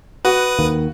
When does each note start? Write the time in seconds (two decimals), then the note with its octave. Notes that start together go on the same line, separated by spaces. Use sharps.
0.25 F#4 B4 D#6
0.58 D#2 D#3 A#3